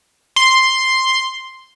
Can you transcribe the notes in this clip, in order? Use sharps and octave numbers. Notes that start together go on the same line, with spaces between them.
C6